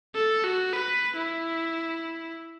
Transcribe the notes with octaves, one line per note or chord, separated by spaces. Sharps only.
A4
F#4
B4
E4